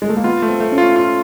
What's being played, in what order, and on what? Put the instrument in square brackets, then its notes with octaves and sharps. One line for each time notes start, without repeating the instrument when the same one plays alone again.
[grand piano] G#3
A3
A#3
[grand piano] B3 [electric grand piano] F4
[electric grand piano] A3
[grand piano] C4
[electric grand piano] A3
[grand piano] C#4
[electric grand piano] F4
F4